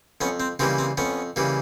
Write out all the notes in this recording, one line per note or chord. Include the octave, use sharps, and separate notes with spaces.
F2 B3 C#4
C4
C#3 E3 G3 A#3 C4
C4
F2 B3 C#4
C#3 E3 G3 A#3